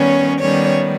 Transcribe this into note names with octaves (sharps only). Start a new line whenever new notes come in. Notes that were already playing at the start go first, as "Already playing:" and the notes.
Already playing: D#3 G3 B3 C#4 C#5
D#3 G3 B3 C#4 C#5